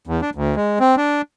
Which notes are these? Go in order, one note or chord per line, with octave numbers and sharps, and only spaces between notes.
E2
D4
D2
G#3
C4
D4